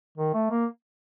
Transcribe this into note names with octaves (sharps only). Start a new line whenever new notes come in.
D#3
A3
A#3